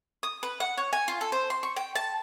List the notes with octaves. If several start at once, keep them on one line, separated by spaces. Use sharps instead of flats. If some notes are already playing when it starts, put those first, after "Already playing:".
D#6
B4
F#5
C#5
G#5
F4
A4
C5
C6
C#6
G5
A5